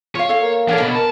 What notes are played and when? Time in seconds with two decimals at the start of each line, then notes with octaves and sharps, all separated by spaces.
0.15 F4 C#5 F5
0.29 A4 F5
0.42 A#3
0.69 D4 A4 A#4 C#5 F#5
0.80 B2 B5
0.96 A#4 A5